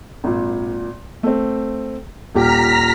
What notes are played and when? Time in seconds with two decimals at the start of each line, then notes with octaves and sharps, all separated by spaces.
0.24 G#1 A#2
1.23 A3 C4
2.35 D#1 A#2 G4 A#5 F6 B6